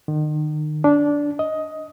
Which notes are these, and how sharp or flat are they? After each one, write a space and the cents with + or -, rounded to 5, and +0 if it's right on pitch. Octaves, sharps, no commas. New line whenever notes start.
D#3 -35
D4 -15
D#5 +10